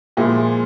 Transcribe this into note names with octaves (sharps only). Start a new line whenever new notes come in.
A#2 F3 G#3 E4